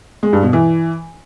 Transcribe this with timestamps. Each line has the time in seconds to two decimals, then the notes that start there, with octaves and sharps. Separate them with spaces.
0.23 G#3
0.33 G2
0.43 B2
0.53 E3